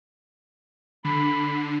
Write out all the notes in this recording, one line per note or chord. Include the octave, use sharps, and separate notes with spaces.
D3 B5 C7